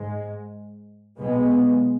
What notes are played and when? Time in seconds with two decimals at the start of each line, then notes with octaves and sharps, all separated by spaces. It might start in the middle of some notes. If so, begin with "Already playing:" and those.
Already playing: G#2 G#3
1.18 B1 B2 G#3 B3